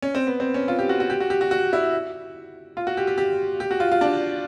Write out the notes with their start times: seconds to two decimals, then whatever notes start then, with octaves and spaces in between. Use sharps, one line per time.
0.02 C#4
0.15 C4
0.27 B3
0.40 C4
0.54 C#4
0.68 F4
0.79 G4
0.89 F#4
1.00 F#4
1.10 G4
1.20 F#4
1.30 G4
1.41 F#4
1.51 F#4
1.73 E4
2.77 F4
2.87 F#4
2.97 G4
3.07 G4
3.18 G4
3.60 G4
3.71 F#4
3.80 F4
3.92 F4
4.01 D4